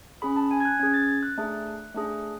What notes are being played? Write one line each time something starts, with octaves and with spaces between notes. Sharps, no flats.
C#4 G#4 B5
A5
G#5
G#6
F#6
C#4 G#4 G#6
A6
A6
F#6
A3 D4 G#4
A3 D4 G#4